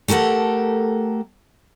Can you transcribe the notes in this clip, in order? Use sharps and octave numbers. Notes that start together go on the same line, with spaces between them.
A3 G4 A4 A#4 F#5